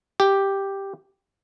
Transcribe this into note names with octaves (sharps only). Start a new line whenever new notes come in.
G4